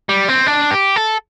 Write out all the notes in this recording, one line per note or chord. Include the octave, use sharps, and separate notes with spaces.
G3
C4
D4
G4
A4